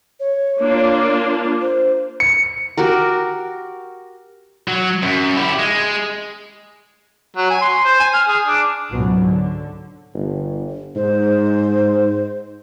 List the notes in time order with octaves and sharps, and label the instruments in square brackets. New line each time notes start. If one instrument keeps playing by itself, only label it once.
[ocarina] C#5
[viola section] A#3 D4 F4
[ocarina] C5
[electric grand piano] C#7
[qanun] F#4 G4 A#4
[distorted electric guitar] F#3
F#2
E4 G4
G#3
[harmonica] F#3
G#5
C6
C5
G#5
F6
G#4
D4
[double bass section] C#2 G#2 B2 F#3
D3
[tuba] G1
[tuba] G#2 [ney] C5